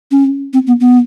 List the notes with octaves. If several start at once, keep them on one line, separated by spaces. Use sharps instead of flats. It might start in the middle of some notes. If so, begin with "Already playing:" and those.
C#4
C4
B3
B3